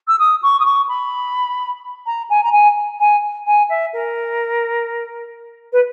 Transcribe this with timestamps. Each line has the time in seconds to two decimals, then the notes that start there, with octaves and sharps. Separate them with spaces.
0.07 E6
0.19 D#6
0.42 C#6
0.59 D#6
0.65 C#6
0.88 B5
2.06 A#5
2.29 G#5
2.43 A#5
2.52 G#5
3.00 G#5
3.46 G#5
3.69 E5
3.93 A#4
5.72 B4